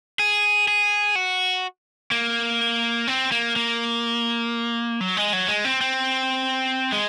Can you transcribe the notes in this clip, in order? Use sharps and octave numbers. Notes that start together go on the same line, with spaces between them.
G#4
G#4
F#4
A#3
C4
A#3
A#3
F#3
G#3
F#3
G#3
C4
C4
G#3